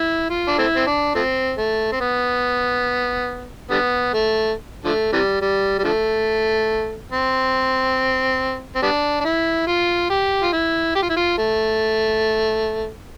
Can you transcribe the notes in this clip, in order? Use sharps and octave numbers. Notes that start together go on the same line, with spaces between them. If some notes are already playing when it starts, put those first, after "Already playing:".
Already playing: E4
F4
D4
A3 C4 E4
C4
D4
F3 A3 C4
A3
C4
B3
D3 G3 B3
A3
D3 F3 A3
C3 E3 G3
G3
G3
D3 F3 A3
C4
C4
G3 B3 D4
D4
E4
F4
G4
F4
E4
G4
F4
E4
F4
A3